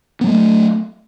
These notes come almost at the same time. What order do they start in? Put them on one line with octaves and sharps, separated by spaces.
B3 F#3 A3